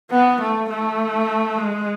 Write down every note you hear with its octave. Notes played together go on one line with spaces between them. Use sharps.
B3
A3
A3
G#3